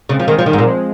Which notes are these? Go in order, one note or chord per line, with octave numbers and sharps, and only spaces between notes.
C#3 G#3 C4
F3
D#3 G#3 C4
F3
D#3
G#2
A#2
F3 G#3